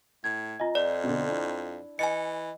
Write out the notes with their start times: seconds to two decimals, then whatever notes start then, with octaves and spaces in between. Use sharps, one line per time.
0.24 A2 G#6
0.60 F4 D#5 G#5 A#5
0.75 F2 D5
1.04 B2 D3
1.28 D4 E4
1.99 E3 D#5 G#5 C#7